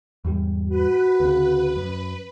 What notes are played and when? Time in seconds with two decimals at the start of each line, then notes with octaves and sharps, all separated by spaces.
0.25 E2 G#2 G3
0.69 F#4 B4
1.20 D2 C#3
1.76 F#2